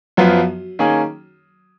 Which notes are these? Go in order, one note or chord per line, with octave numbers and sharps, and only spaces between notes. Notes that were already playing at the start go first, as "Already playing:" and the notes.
F#2 F3 F#3 B3 F4
D#3 A#3 C#4 G#4